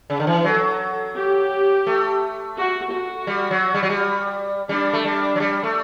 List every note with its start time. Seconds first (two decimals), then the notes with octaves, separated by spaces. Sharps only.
0.10 C#3
0.20 D3
0.27 E3
0.44 F#3 A4
1.15 G4
1.87 A3
2.57 F#4
2.92 F#4
3.27 G3
3.51 F#3
3.74 G3
3.83 F#3
3.89 G3
4.69 G3 D4
4.93 A3
5.04 G3
5.36 F#3
5.40 G3
5.63 A3